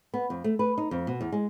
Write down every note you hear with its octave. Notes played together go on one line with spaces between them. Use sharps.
B3
F2
A3
B4
D#4
F2
B2
E2
G#3